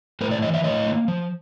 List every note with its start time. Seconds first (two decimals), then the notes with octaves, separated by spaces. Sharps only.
0.21 A2 A#4 C5
0.31 C5 D5
0.42 E3 C#5 D#5
0.54 D5 E5
0.64 A2 C#5 D#5
0.87 A#3
1.08 F3